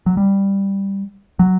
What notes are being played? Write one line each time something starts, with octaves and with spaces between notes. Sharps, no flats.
F#3
G3
F#3